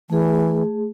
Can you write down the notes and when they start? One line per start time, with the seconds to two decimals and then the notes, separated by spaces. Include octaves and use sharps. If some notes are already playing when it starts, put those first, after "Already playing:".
0.10 E3 A3 G#4